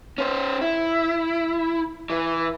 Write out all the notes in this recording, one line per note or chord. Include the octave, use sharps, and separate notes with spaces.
C#4 C5
E4
E3